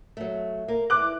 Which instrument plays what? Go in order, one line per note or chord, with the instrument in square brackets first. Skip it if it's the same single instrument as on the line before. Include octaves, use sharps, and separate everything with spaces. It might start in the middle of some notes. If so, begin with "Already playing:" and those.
[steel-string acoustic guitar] F#3 A3
A#3
[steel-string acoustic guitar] E3 [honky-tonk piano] D6 F#6